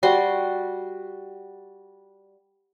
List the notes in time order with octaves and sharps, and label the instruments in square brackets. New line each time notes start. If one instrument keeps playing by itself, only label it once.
[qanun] G3 F#4 C6